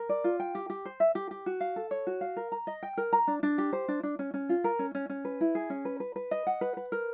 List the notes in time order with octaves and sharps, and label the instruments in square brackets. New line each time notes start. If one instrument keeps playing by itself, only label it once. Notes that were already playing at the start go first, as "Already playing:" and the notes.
Already playing: [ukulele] A#4
D5
F4
G5
G4
G4
C5
E5
G4
G4
F#4
F5
A4
C#5
F#4
F5
A#4
A#5
D#5
G5
A#4
A#5
D4
D4
G4
C5
D4
D4
C#4
C#4
F4
A#4
C#4
C#4
C#4
B4
E4
G#4
C#4
B4
B4
B4
D#5
F#5
B4
B4
A#4